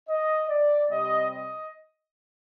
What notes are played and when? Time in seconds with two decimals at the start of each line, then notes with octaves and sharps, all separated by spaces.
0.09 D#5
0.49 D5
0.89 C3 G3 C4 D#5
1.30 D#5